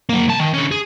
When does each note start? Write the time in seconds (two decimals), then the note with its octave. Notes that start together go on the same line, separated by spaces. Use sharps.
0.09 F#3 A#3
0.28 C2 A5
0.40 D#3
0.54 D3 C#4
0.71 G#4